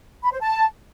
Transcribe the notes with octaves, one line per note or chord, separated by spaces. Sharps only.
B5
C5
A5